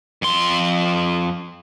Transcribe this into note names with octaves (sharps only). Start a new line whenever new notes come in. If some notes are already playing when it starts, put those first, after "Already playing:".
F2 C6